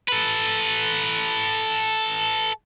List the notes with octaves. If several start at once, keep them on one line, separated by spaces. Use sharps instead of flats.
A4 B4